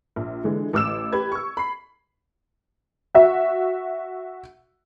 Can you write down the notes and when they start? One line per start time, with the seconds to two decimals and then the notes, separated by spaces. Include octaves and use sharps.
0.16 A#1
0.44 D3 E3 G#3
0.73 A1 D6 E6 E7
1.12 G4 B4 G#6
1.32 C#6 E6
1.57 B5 C7
3.15 F#4 E5